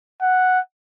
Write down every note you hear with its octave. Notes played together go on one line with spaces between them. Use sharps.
F#5